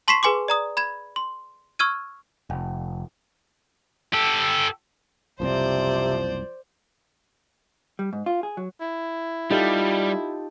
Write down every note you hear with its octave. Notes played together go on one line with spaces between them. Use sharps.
A5 C6 C#6 B6 C7 E7
G#4 B4 G#5 C6 D6
D5 A#5 D#6
B5 G#6 E7
C6
C#6 E6 F6 G#6 D#7
F1
G4 A4
F#1 C2 C3 F3 C4 C5 D5
G3
G#2
F4
G#4
F#3
E4
G3 D#4 F4 G4 A4